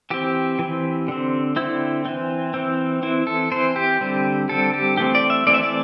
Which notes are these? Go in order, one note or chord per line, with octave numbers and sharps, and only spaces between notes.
E3 C4 G4
E3 C4
D3 C4
D3 C4 E4
E3 C4
E3 C4
E3 C4 E4
A4
E3 C4 C5
G4
D3 G3 C4
D3 G3 C4 A4
G4
E3 A3 C4 G4
D5
E5
E3 A3 C4 D5
E5
D5